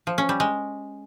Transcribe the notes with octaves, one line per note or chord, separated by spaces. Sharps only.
F3
C#4
G3
G#3